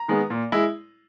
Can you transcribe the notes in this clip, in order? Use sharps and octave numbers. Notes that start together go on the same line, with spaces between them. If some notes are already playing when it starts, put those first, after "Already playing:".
Already playing: A#5
D#3 G#3 B3
A#2
G#3 E4